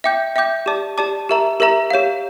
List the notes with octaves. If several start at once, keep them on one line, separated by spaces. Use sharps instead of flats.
E5 G5 D6 G6
E5 G5 D6 G6
G4 D5 A5 D6
G4 D5 A5 D6
G4 A#4 E5 A#5
G4 A#4 E5 A#5
G4 C#5 F5